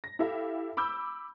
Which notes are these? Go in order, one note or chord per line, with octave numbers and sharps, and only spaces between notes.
A#6
E4 G4 A4 E5 F5
B5 D6 E6 G6